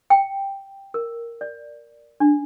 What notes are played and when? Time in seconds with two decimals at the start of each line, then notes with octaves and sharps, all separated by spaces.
0.10 G5
0.94 A#4
1.41 D5
2.20 D4